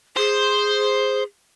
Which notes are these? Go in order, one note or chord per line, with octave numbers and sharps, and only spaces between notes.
G#4 C5